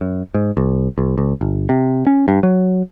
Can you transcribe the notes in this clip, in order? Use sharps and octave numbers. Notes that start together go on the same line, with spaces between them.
F#2
G#2
C2
C2
C#2
G1
C3
C#4
G2
F#3